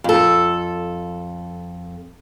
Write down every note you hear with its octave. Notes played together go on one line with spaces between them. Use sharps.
F2 A4